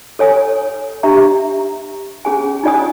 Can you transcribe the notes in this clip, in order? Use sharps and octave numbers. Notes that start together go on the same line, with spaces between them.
A4 C#5 G#5 D#6
D4 G4 E5 A#5
C#4 G#4 G#5
D#4 F4 D5 G#5 D#6